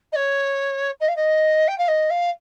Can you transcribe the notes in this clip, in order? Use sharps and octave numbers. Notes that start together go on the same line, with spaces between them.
D#5
C#5
D#5
F5
D#5
G5
F5
D#5
F5